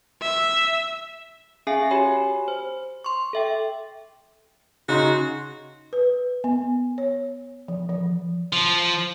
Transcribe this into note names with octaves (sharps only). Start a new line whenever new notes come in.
E5
C#4 G#4 E5 F5 G#5 C7
F#4 G4 C#5 G#5 B5
C5
C6 C#6
A4 E5 G5
C#3 D#4 F#4 C6
B4
B3
C#5
F3
F3
F3